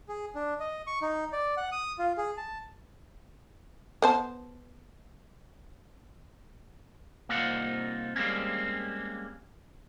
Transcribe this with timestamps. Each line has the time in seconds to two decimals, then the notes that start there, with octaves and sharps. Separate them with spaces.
0.09 G#4
0.35 D4
0.60 D#5
0.87 C#6
1.02 D#4
1.32 D5
1.57 F#5
1.72 D#6
1.99 F4
2.17 G#4
2.37 A5
4.02 B3 C5 A5
7.29 C2 A#3 C4 D#4 F4 F#5
8.16 G3 G#3 A#3 C4 C#4